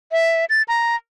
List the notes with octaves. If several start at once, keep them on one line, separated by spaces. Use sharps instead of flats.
E5
A6
A#5